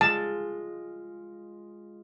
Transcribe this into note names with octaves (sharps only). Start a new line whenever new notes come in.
G#3 F4 A5